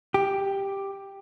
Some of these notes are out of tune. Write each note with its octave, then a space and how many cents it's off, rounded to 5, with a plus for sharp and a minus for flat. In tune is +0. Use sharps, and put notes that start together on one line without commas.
G4 +5